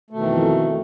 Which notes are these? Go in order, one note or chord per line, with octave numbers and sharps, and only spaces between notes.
F2 B2 D#3 E3 A3